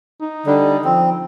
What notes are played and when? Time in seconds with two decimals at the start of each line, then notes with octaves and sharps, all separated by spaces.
0.21 D#4
0.46 D3 G3
0.84 F3 C4